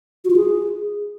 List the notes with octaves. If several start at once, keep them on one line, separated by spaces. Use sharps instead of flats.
F#4
F4
G#4